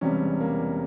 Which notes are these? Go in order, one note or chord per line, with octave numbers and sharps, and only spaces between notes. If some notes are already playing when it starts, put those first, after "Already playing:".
E1 E2 C3 G3 C#4
A#3